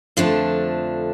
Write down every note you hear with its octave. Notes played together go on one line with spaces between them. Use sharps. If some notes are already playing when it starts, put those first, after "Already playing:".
F2 D3 F3 A3 D4